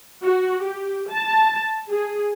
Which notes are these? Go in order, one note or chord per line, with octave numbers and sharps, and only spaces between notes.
F#4
G4
A5
G#4